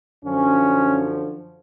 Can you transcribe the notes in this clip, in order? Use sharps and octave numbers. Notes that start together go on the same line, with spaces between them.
F#2 D3 F3 C#4